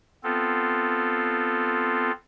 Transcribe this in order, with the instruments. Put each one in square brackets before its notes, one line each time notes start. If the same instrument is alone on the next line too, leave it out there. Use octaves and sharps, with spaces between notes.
[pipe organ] B3 C4 F4 A4